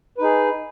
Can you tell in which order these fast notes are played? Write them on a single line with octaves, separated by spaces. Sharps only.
B4 D#4 G#4